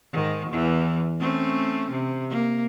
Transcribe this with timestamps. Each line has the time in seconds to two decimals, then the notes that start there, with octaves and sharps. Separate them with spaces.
0.12 G#2 D#3
0.49 E2 E3
1.20 A3 C4 C#4
1.91 C3
2.29 A#3